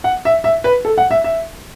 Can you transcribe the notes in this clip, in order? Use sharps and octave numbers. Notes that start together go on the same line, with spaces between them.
F#5
E5
E5
B4
A4
F#5
E5
E5